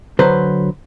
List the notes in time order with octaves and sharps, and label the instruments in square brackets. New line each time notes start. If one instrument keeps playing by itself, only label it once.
[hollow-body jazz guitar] D3 F#3 B4 C5